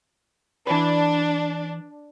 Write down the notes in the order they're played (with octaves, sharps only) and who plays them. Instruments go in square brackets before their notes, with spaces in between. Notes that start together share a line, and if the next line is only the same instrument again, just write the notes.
[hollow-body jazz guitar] E3 B4 [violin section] D4